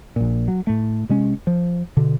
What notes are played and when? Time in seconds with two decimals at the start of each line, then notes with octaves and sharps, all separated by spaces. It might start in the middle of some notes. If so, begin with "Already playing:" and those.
0.16 A#1 A#2
0.48 F#3
0.67 A2 A3
1.09 C3 G#3 C#4
1.47 F3
1.97 B2 D3